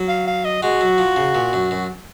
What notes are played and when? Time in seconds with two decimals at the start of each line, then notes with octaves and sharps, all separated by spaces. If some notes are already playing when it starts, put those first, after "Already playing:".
Already playing: F#3
0.08 F5
0.27 F5
0.45 D#5
0.62 G#3 F#4
0.81 F#3
0.98 F3
1.16 C#3
1.35 A#2
1.53 F#2
1.71 F#2